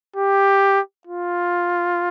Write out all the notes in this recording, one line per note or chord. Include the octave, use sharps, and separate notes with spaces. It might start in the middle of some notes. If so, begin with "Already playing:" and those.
G4
F4